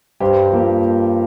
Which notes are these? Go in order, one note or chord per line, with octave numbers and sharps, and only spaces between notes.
G2 G4 C5
F3 A#3